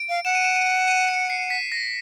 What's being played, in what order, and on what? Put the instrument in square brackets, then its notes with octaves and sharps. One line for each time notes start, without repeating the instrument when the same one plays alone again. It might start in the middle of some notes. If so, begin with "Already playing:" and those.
Already playing: [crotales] D7
[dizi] F5
[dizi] F#5 [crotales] E7
[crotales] D#7
E7
D#7
D#7
C#7
C7
B6
A#6